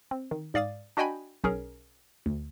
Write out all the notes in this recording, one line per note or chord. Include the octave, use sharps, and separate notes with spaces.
C4
D#3
G#2 D5 F5 D#6 A6
D4 F#4 D#5 G5 G#5 B5
B1 C#4 G#4 A#4
D2